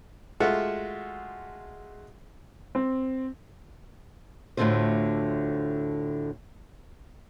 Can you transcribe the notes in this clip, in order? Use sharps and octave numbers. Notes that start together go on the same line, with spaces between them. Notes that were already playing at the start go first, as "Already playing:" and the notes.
G#3 A3 F4 F#4 E5 F#5
C4
D2 A2 D3 C4 F4 C5